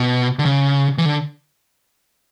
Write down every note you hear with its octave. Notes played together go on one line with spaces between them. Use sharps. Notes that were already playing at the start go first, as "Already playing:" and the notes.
Already playing: B2
D3
C#3
E3
D3